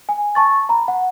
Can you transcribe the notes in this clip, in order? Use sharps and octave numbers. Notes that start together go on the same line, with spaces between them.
G#5
A5 C#6 A6
A#5 B5
F#5